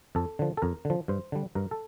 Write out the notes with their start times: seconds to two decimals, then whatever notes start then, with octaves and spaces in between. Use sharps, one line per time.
0.15 F2 A4
0.39 D3 F3
0.57 A4
0.62 F2 A#4
0.85 D3
0.90 F3
1.08 G2 C5
1.32 D3 G3
1.55 G2 A#4
1.71 A4